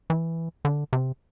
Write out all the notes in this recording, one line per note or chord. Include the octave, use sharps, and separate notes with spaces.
E3
D3
C3